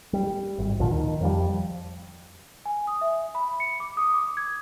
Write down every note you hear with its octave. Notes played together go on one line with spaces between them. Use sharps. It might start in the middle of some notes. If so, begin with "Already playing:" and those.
G3
G#1
D2 A#2 D3 F3
D#3
F2 F3 G3
G#5
D#6
E5
B5
C#7
D6
D#6
D6
G#6